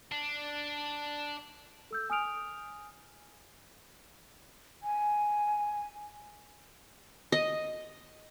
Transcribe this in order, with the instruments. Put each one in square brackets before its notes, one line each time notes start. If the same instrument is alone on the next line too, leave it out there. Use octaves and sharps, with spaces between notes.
[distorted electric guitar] D4
[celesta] A4 E6 G6
G#5 D#6 F6 D7 F7
[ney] G#5
[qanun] D#5